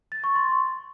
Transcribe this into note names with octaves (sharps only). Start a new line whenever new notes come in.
A6
C#6
C6